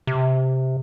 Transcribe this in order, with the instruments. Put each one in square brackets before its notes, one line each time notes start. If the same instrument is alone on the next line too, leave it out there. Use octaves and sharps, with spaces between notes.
[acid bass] C3